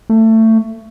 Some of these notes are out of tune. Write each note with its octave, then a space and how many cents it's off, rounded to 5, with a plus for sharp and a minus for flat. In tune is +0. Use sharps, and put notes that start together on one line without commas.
A3 +20